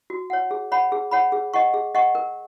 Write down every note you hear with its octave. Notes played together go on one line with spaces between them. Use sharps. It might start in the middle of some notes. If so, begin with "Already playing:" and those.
F#4
C#5 F#5
G#4
C#5 F#5 B5
G#4
C#5 F#5 B5
G#4
D#5 F#5 C#6
G#4
D#5 F#5 C#6
A#4